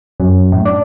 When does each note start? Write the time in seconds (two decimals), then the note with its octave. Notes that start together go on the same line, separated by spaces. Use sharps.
0.20 F#2
0.52 A2
0.65 D4